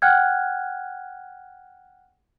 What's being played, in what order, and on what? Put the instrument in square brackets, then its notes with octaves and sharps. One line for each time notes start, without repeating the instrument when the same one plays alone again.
[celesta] F#5 G5 F6 F#6 G#6